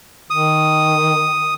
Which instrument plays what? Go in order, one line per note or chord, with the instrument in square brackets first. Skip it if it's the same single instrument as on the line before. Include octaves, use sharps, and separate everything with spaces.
[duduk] D#3 [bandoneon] D#6